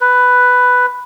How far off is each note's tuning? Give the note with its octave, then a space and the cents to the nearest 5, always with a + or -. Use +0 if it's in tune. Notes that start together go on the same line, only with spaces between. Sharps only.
B4 +5